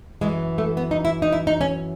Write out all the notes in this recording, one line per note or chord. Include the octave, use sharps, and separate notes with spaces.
F#2 E3 G#3
A3
B3
D#4
E4
D#4
E4
D#4
C#4